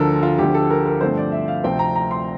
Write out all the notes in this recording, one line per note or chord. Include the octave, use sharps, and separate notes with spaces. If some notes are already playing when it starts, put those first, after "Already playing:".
Already playing: D2 D3 F3 A4 A#4
F4
D2 D3 F3 G4
A4
A#4
A#4
G2 D3 F3 A3 C4 C5
D5
E5
F5
D2 C3 F3 A3 C4 G5
A#5
A#5
C6